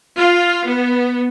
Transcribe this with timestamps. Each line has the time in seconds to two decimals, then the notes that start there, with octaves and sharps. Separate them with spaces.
0.17 F4
0.66 B3